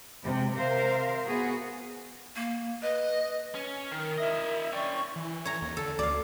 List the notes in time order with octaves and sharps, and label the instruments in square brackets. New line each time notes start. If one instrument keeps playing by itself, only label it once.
[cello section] C3 G#3
C3 A#4 C5 E5 F5
B3 F#4 G#4
[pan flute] A#3
[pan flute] B4 [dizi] D#5
[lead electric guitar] C#4
[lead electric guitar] D#3 [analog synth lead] A#4
[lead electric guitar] E4 D#5 [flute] E5
[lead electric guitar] C#4 G5 [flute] D5 [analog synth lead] C#6
[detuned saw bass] E3
[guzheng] C#5 A#5
[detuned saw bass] D#2
[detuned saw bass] D3 [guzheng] A4
[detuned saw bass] D2 [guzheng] D5 F5